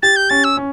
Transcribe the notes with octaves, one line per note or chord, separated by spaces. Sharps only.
G4 A6
G6
C#4 A6
E6
C#4